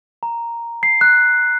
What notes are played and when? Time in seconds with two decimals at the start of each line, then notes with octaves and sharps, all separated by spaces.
0.23 A#5
0.83 C7
1.01 F#6